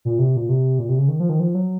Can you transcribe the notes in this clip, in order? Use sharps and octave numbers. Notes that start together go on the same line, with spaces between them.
A#2
C3
A#2
C3
A#2
C3
C#3
D#3
F3
D#3
F3
F#3